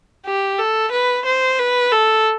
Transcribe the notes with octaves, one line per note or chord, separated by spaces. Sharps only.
G4
A4
B4
C5
B4
A4